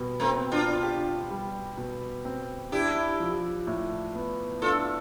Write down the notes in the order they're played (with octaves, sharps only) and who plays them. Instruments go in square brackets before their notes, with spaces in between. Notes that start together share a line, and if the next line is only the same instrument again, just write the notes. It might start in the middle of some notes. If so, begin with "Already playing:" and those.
Already playing: [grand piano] B2 G3
[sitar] A3 C4
[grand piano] C4
[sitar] D4 F4
[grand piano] G4
G3
B2
C4
[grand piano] D4 [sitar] E4 G4
[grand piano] F3
A2
B3
[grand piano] D4 [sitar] F4 A4